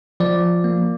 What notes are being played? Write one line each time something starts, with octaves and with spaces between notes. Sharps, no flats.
F3 D5
A#3